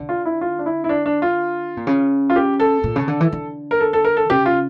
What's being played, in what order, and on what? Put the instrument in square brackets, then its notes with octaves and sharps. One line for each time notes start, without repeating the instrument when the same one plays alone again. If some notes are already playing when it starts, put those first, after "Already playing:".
Already playing: [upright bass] D3
[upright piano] F4
E4
F4
D4
E4
E4
D4
D4
F4
[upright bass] A#2
C#3
[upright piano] F4
G4
A4
[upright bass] A#2
C#3
D3
E3
D3
[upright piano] A#4
A4
A4
A#4
A4
[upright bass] C#3 [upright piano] G4
[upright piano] F4